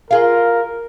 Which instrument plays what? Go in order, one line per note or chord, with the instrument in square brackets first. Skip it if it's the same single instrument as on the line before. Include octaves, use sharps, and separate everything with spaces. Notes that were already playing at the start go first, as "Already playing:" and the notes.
[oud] F4 G#4 F5 [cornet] A#4